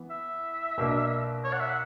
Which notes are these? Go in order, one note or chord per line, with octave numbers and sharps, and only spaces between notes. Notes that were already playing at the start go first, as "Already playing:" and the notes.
Already playing: E3 B3
E5
B2 A#3 D4
C#5
F#5
E5
F#5